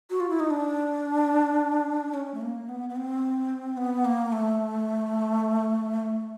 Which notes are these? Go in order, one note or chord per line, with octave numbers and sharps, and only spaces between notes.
F#4
F4
E4
D#4
D4
C#4
A3
A#3
B3
B3
C4
B3
A#3
A3